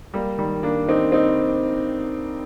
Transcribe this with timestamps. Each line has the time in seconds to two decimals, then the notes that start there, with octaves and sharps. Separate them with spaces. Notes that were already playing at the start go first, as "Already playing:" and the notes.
0.14 G3 A#3
0.38 D#3 G3
0.63 A#3 D4
0.88 C4 D#4
1.12 C4 D#4